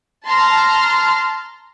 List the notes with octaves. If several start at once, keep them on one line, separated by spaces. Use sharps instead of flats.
A5 A#5 C6 F6